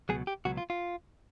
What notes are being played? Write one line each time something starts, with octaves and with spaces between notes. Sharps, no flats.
C#2 B2 F#3 G#4
G4
C#2 B2 F#3 F#4
F4
F4